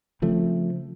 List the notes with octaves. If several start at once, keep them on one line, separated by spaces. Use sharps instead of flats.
C#3 F3 A3 C4